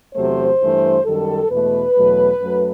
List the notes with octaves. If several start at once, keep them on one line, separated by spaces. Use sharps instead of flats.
E2 C3 F#3 A3 C5
G2 E3 A3
F#2 D#3 G3 A4
E2 B2 A3 B4
E2 B2 F#3 A3
F#2 F#3 A3